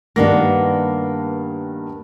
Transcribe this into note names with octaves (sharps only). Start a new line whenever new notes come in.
G2 D#3 A#3 B3 D4 A#6